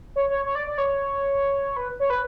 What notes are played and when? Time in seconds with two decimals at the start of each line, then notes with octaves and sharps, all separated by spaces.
0.16 C#5
0.30 C#5
0.45 C#5
0.55 D5
0.67 D5
0.78 C#5
1.76 B4
2.00 C#5
2.10 B4